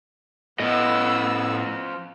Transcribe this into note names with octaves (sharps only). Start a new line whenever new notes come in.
A2 F3 B3 D#5 E6